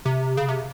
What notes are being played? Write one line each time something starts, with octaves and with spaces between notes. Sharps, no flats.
C3
C#3
C3